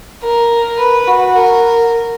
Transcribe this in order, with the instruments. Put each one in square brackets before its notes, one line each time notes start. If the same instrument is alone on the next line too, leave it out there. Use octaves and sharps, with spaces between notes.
[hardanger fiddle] A#4
B4
F#4
A#4